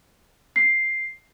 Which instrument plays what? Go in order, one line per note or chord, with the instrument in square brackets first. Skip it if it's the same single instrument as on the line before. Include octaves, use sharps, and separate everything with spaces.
[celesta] C7